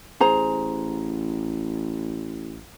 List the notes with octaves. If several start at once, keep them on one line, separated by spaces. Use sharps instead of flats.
A1 G#4 C5 A#5